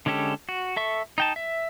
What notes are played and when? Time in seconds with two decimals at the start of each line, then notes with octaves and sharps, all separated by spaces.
0.06 D3 G#3 C#4 G4 A4
0.49 F#4
0.76 A4 E5 C#6
1.18 D#4 G5 A5
1.36 E5